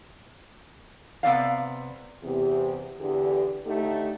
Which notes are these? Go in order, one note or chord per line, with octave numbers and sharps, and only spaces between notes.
C3 B3 D5 F5
E2 C3 G4
E2 D3 G4
D#2 D3 A3 D#4 G4 A4